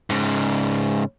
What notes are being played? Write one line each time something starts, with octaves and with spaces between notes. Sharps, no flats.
G#2 C#3